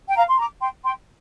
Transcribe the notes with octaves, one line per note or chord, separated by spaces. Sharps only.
G5
F5 A#5
C6
A#5 D6
G5 C6
G5 C6